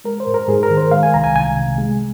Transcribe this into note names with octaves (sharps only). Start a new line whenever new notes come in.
G#3 A#4
C5
G#2
A#4
G#2 G#4
A#4
D#3
C5
G#3 F5
G#5
C2 A#5
G#5
C2 G#5
C3
G#3